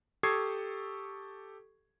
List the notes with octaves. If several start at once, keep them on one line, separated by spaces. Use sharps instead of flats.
G4 A4 C#6 D#6 G#6 C7